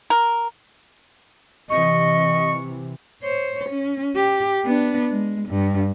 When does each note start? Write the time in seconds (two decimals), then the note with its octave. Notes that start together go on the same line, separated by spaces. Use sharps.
0.10 A#4
1.70 C3 E3 D#5 C#6
3.23 C5 C#5
3.69 C#4
4.16 G4
4.65 B3 D4
5.11 G#3
5.49 G2